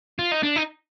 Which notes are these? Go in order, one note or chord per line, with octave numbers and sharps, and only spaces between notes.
F4
D#4
D4
D#4